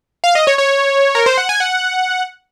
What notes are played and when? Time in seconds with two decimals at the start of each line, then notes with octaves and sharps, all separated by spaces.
0.24 F5
0.35 D#5
0.47 C#5
0.58 C#5
1.15 A#4
1.26 C5
1.37 F#5
1.49 G#5
1.60 F#5